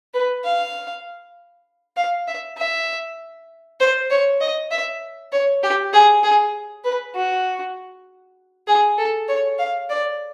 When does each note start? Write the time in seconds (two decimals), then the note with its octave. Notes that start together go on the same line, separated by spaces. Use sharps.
0.14 B4
0.44 F5
1.97 F5
2.27 E5
2.58 E5
3.80 C5
4.10 C#5
4.41 D#5
4.71 E5
5.32 C#5
5.63 G4
5.93 G#4
6.23 G#4
6.84 B4
7.15 F#4
8.68 G#4
8.98 A4
9.29 C#5
9.59 F5
9.90 D5